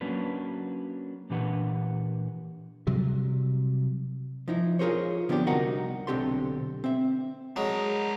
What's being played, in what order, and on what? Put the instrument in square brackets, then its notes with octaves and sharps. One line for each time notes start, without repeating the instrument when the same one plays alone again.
[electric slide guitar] F#3 A#3 C#4 D4 F#4 B4
A#2 E3 D4 G4 B4 F#5
[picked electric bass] C3 F#3 G3
[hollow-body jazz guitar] F3 D#4 E4
F4 F#4 G#4 A#4 C5 C#5
D3 F3 B3 C4 D4 G4
C2 D#4 F#4 A#4 F#5 A#5
B1 D3 C4 G4 A4 C6
C4 E5
[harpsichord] F#3 G#3 [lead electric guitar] D4 A#4